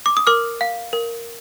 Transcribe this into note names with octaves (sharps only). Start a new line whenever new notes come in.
D6
D#6
A#4 D6 F6
F5
A#4